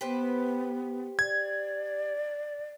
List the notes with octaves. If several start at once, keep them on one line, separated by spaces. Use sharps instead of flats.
B3 G4 B4 C5
D5 G#6